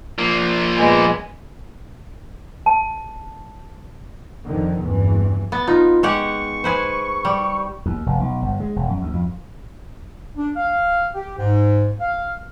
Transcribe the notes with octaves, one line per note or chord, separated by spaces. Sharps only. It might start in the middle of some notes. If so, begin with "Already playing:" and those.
F3 A#3
A#2 G#3 B3
A5
F2 D3 D#3
F#1 E2 G2 E3
B3 A6
D#4 F4
G#3 G4 F#5 C#6
G#4 B4 C5
G3
D#2
F1
B1
G1
G#3
E1
F#2
D2
F2
D4
F5
G4
G#2
F5